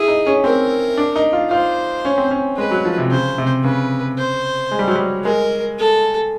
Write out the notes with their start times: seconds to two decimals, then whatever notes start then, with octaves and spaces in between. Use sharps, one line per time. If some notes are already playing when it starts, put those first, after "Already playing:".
Already playing: E4 G#4
0.08 D#4
0.26 C#4
0.44 C4 A#4
0.97 D4
1.16 D#4
1.33 F4
1.51 F4 C5
2.05 C#4
2.18 C4
2.31 C#4
2.57 G#3 B4
2.71 F#3
2.85 F3
2.98 C3
3.11 C#3 C5
3.38 C3
3.64 C#3 B4
4.18 C5
4.71 G#3
4.79 G3
4.88 F#3
4.96 G3
5.25 G#3 A#4
5.79 A4